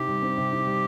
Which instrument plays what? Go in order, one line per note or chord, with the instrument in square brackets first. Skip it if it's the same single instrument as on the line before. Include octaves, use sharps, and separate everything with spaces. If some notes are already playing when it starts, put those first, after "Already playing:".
Already playing: [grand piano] C3 D#4 [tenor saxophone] G4
[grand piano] G3
C4
C3
D#4
G3